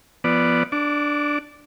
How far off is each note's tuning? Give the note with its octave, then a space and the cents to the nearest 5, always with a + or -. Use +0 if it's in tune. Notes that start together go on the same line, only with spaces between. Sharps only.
F3 -25 B3 +0 D5 +0
D4 +0 D6 -30